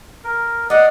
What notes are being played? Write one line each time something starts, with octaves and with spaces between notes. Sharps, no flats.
A#4
D5 D#5 F5 F#5 D#6